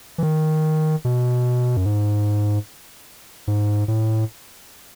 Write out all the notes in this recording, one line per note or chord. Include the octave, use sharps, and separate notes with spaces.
E3
D#3
B2
F#2
G#2
G#2
A2